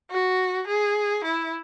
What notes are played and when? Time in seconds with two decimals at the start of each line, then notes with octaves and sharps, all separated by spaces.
0.11 F#4
0.67 G#4
1.24 E4